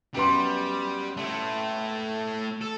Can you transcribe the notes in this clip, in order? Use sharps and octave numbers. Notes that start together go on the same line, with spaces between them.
F#2 G3 B3 C6
A3 E4
A4